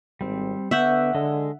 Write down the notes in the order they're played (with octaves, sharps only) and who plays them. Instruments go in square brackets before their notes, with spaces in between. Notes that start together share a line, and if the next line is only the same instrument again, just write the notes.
[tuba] G#1 [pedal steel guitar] G3 C4
[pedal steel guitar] D3 C#6 G6 [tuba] B3 [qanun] E5 F#5
[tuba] D3 [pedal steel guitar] G#3 A4 D#5